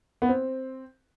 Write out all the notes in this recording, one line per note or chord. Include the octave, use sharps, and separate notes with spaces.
B3
C4